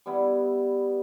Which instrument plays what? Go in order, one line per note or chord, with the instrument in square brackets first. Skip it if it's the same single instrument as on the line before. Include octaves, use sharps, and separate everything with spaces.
[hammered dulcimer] G3 B3 E4